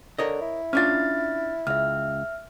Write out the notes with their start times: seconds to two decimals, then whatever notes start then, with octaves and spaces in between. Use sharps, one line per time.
0.18 D3 A#4 C#5 D#5
0.41 E4
0.73 C#4 D4 F4 F6 A6
1.67 C#2 E5 F6